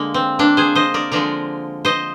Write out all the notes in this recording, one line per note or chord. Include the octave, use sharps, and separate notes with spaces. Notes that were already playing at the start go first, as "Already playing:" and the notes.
Already playing: D3 G#3 A#3
C4
A#3 D4
G#4 C5
C5 D#5
A#4 D5
D3 F3 G#3 A#4 D5
C5 D#5